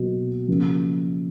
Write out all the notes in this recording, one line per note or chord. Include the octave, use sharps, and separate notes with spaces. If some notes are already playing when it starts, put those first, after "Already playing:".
Already playing: B2 F#3 A#3
C#3 F3 A#3